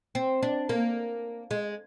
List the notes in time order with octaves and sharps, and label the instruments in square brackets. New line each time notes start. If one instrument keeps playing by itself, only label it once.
[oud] C4
D4
A#3
G#3